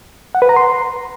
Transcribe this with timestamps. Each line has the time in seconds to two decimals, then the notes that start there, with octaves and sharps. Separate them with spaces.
0.35 F#5
0.42 B4
0.49 A#5
0.56 C6